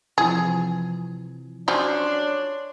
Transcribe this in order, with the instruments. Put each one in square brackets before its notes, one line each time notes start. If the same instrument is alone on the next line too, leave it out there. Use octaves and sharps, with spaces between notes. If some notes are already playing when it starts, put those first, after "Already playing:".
[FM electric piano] C3 E3 F3 [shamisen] G#4
[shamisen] F3 F#3 C#4 [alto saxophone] D4 [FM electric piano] C#5 C6